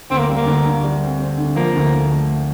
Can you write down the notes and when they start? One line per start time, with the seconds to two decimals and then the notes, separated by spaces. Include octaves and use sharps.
0.10 D2 C4
0.18 A#3
0.29 G3
0.37 A#3
0.46 D2
0.65 D3
0.83 G3
1.02 C4
1.20 C4
1.38 D3
1.56 F3 A#3
1.75 D2
1.93 D2
2.11 A3